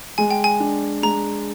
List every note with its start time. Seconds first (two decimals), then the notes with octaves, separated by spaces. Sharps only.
0.18 G#3 G#5
0.31 G5
0.44 G#5
0.60 D4
1.03 G#3 A#5